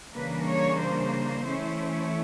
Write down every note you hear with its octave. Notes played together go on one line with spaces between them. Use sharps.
C#3 E3 G3 A#3 D4 B4
C#5
C5
E3 A3 C#4 E4